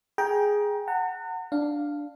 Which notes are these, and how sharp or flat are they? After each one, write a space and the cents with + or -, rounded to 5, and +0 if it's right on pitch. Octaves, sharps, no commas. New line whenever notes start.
G#4 +0 G5 +0 A#5 +25
F#5 +0 A#5 -45
D4 +0 F5 +0